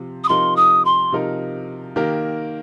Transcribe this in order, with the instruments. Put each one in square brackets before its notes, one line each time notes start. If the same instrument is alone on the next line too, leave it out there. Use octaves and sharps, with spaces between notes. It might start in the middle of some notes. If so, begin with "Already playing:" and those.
Already playing: [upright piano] C3 F3
[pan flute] D#6
[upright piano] C3 F3 D#4 A#4 [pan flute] C6
[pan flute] D#6
C6
[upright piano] C3 F3 D#4 A#4
D#3 A#3 G4 A#4